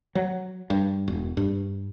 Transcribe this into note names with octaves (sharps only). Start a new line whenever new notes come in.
F#3
G2
E1
G2